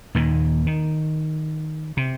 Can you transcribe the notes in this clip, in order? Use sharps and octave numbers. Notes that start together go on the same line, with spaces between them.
D#2 A#2 D#3
D#3
C3